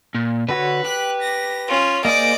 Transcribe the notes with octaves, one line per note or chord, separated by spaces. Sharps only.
A#2
D3 F#4 B4 C#5
G4 F#6
A#6
C#4 F4
A#3 G#4 C5 D5 D#5 D7